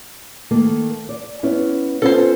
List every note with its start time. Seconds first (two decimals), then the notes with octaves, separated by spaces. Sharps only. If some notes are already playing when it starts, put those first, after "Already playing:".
0.51 D#3 A3 A#3
1.09 D5
1.43 B3 C#4 E4
2.02 B3 C#4 F4 A4 C5